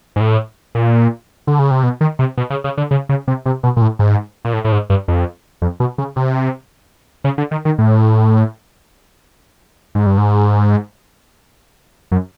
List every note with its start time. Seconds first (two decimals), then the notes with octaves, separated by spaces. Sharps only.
0.16 G#2
0.21 A2
0.75 A#2
1.47 D3
1.59 C#3
1.71 C3
1.83 B2
2.01 D#3
2.19 C3
2.37 B2
2.50 C#3
2.64 C#3
2.77 D3
2.91 C#3
3.09 C#3
3.28 C3
3.46 C3
3.63 B2
3.76 A#2
3.82 A2
3.99 G#2
4.45 A#2
4.53 A2
4.64 A2
4.72 G#2
4.90 G2
5.08 F2
5.62 F2
5.80 B2
5.98 C#3
6.16 C3
7.24 C#3
7.38 D3
7.51 D#3
7.65 D#3
7.78 A2
9.95 G#2
10.06 G2
10.18 G#2
12.11 F#2